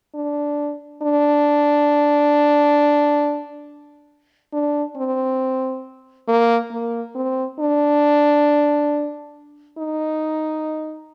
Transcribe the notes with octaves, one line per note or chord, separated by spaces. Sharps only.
D4
D4
D4
C4
A#3
A#3
C4
D4
D#4